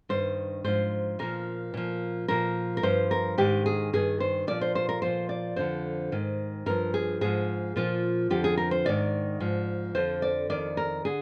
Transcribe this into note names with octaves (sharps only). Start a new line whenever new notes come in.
G2 D#3 C5
G#2 F3 C5
A#2 F3 A#4
A#2 F3
A#2 F3 A#4
A#4
G2 F3 C5
A#4
G#2 D#3 G4
G#4
G2 D#3 G#4
C5
A#2 F3 D5
C5
C5
A#4
A#2 F3 C5
D5
F2 D3 F3 C5
G#2 D#3
G2 F3 A#4
G#4
G#2 F3 G#4
A#2 F3 F4
F2 D3 F3 G4
G#4
A#4
C5
G#2 D#3 D5
G#2 F3
F2 D3 F3 C5
D5
F2 D#3 D5
A#4
D3 G#4